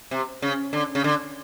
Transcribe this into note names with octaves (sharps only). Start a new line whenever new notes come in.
C3
C#3
D3
C#3
D3